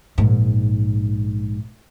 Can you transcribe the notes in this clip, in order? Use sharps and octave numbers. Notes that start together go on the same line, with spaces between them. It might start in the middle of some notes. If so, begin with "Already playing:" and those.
A#1 G#2